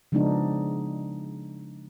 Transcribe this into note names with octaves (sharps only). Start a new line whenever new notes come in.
C#3 F3 G#3 B3 D4 D#4